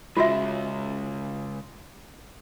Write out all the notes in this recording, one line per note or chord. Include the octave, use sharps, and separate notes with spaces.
C#3 G#3 F4 F#4 E5